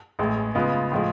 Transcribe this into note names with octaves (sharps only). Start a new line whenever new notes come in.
A1 A2 G#3
C#3 G#3 B3 F4
A2 F3 G#3